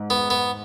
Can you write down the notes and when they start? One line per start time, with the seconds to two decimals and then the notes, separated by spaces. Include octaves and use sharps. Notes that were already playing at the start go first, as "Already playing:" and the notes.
Already playing: G#2
0.10 B3
0.30 B3